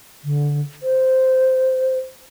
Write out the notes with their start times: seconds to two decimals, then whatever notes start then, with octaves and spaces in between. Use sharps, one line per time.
0.24 D3
0.83 C5